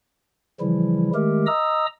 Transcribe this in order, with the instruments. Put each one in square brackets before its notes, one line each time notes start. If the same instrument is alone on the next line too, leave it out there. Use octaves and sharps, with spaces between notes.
[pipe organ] C#3 E3 F3 G3 E4
D#3 G#3 A3 G4 A#4
D#5 A#5 D#6 E6